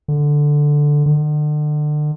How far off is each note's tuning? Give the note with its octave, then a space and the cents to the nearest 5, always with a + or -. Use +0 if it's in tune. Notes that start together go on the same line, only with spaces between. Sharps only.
D3 +0
D3 +35